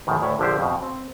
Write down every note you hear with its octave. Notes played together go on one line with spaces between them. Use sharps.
B1 F#2 A2 D#3
D2 A2 C#5 D5 E5 A5
A#1 D3 F3 G4 C5
F2 B2
C4